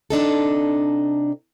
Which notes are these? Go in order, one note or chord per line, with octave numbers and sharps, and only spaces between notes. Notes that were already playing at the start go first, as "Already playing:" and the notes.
C3 D4 D#4 A4